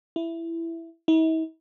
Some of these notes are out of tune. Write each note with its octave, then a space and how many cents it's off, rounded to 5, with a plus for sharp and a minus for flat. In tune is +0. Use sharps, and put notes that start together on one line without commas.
E4 +10
E4 -45